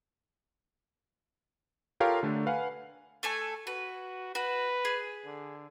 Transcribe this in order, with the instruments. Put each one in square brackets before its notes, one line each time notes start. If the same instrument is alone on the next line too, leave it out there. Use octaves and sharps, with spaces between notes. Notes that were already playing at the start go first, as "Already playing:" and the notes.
[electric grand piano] F4 G4 A4 A#4 C#5 F5
D3 A3 D4
B4 F5 F#5 G#5
[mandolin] A3 A4 G#5
[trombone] F#4 [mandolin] B4
[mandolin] F#4 [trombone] B4
[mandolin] G#4
[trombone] D3